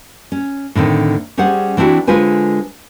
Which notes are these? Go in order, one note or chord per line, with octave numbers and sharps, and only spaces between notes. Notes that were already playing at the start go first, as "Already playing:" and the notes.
C#4
A2 D3 D#3 C4
G3 C#4 G#4 C5 F#5
E3 C4 D4 E4 F#4
D3 G#3 F4 B4 C5 G#5